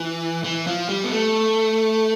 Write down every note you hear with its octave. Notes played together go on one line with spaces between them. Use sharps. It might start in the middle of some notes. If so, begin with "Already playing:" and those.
Already playing: E3
E3
F3
G3
B3
A3